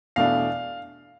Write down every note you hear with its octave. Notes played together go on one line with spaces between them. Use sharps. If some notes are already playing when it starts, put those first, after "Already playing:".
E2 B2 A3 D4 F5